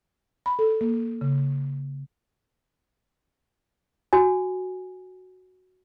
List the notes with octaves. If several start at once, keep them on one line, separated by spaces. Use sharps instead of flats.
B5
A4
A#3
C#3
F#4 G#5